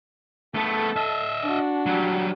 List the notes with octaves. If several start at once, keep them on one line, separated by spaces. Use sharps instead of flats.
A3 B3 A4 A5
D#5 E5
D4 F#4
F#3 G3